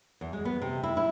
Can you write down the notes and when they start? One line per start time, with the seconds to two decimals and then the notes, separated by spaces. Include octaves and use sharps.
0.21 E2
0.33 G#3
0.45 B3
0.62 C3
0.83 E4
0.97 E4